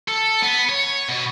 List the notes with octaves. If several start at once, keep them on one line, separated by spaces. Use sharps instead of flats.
A4
B3
C#5
B2